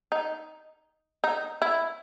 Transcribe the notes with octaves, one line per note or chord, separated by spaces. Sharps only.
D#4
D#4
E4